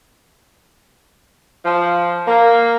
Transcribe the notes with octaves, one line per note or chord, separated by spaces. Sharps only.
F3
A#3